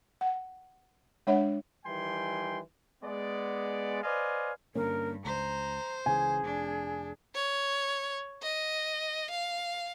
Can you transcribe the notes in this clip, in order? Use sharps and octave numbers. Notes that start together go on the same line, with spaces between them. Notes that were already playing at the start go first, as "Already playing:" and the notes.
F#5
G#3 D4 C#5 E5 F#5
D#3 E3 G3 G5 G#5 C6
G#3 B3 D5
B4 C5 D5 D#5 F5 G#5
G2 D3 A#3 C#4 A#4
C#2 C5 A#5
C#2 C#3 E3 G#4 G#5
F1 D4
C#5
D#5
F5